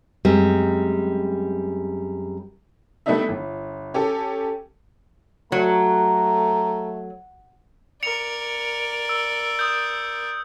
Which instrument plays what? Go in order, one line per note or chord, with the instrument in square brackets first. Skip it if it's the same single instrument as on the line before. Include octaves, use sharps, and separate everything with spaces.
[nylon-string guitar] F#2 G3 G#3 C4
[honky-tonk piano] G3 A3 B3 D4 D#4 E5
G1
C#4 G4 A4
[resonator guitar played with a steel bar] F#3 [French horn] A3 [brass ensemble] A#5
[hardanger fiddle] A#4 D5 [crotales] C#7 F7
[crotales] E6
D#6 G6